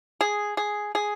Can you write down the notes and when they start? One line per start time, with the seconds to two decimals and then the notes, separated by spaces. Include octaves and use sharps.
0.21 G#4
0.57 G#4
0.95 G#4